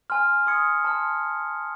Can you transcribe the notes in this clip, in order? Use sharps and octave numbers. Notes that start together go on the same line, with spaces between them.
G#5 C6 F6
C6 D#6 G#6 C#7
A5 C6 F6